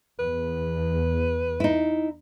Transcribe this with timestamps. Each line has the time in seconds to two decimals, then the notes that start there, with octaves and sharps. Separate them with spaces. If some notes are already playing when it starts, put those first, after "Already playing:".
0.19 E2 B4
1.60 D#4 E4